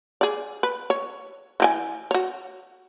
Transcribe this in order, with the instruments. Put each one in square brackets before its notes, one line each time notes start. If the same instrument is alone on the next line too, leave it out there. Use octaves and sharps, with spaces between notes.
[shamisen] G#4 D5
B4
C#5
E3 G4 G#5
F#4 C#5